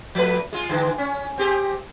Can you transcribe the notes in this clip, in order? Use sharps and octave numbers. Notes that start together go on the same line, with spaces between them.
F3 A3 B4
G#3 F4
D3 E3 G#3
C#4
C4 G4 G#4